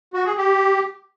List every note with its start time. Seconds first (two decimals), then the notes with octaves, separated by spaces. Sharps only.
0.14 F#4
0.25 G#4
0.37 G4